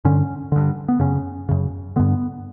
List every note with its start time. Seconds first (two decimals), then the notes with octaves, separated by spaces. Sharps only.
0.05 G2 D3 C#4
0.52 G2 D3
0.88 B3
1.00 F#2 C#3 C#4
1.49 F#2 C#3
1.96 G2 D3 B3